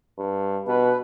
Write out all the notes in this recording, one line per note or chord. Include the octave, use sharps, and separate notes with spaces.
G2
B2 B4